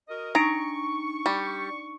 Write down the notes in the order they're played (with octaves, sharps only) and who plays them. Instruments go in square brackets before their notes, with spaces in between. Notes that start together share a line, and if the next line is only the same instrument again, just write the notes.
[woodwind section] F#4 A#4 D#5
[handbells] D4 D#4 D7 [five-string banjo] A#5 [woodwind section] C#6
[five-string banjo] G3